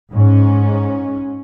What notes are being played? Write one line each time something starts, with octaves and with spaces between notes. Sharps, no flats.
G#2 C#4